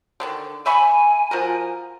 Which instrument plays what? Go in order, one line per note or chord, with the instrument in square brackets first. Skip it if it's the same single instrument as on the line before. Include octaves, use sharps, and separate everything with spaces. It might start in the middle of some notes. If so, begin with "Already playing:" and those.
[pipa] D3 D#3 D4
[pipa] E5 B5 C#6 [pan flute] G#5
[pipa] F3 F#4 A#4